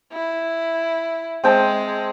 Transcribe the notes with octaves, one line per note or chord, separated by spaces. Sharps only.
E4
G#3 C4 G5 A5